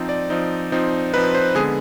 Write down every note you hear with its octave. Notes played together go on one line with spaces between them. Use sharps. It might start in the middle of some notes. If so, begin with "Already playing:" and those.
Already playing: F3 C4 D#4
D5
F3 C4 D#4
F3 C4 D#4
F3 C4 D#4 B4
C5
D3 G#3 B3 G#4